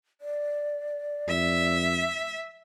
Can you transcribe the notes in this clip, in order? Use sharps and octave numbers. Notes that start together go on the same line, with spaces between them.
D5
F2 E5